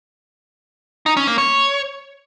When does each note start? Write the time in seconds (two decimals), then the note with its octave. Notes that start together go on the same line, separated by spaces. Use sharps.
1.06 D#4
1.17 C#4
1.27 A#3
1.38 C#5